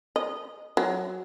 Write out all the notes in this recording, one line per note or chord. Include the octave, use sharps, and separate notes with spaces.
D#5
F#3